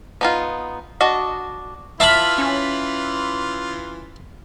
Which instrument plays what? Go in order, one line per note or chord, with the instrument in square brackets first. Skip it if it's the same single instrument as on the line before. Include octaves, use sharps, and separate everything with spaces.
[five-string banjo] B3 D#4 F4
D4 F#4 D#5
[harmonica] E3 F4 [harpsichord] E5 B5 [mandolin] F5 A5 F6
[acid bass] C#4